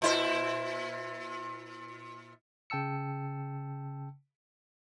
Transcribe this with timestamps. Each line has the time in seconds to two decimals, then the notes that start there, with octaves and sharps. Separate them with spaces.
0.02 A#2 E4 C5
2.70 C#3 G5 A5 E6 C#7